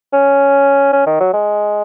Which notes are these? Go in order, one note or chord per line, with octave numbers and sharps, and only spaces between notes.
C#4
C#4
D#3
F#3
G#3